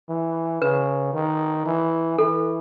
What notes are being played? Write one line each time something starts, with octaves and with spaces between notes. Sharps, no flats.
E3
C#3 B4
D#3
E3
E3 A4